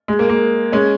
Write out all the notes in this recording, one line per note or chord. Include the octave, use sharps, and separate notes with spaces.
G#3
A#3
A#3
G#3 C#4